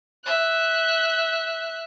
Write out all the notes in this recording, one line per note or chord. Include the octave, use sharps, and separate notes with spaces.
E5 F#6